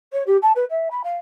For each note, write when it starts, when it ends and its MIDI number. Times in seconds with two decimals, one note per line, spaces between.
0.13 0.23 73
0.26 0.37 67
0.42 0.52 81
0.55 0.64 71
0.70 0.88 76
0.90 1.01 83
1.04 1.17 77